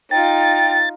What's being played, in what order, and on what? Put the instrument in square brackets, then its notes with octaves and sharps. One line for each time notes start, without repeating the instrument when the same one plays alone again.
[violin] D#4 F4 [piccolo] G5 [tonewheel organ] A6